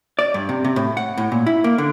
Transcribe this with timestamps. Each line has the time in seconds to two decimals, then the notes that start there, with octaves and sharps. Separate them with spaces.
0.19 D5
0.34 G2
0.49 C3
0.65 C3
0.76 A2
0.97 F#5
1.18 A2
1.32 A#2
1.47 E4
1.64 A#3
1.78 D3